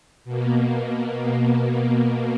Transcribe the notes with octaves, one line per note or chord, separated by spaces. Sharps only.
B2 A#3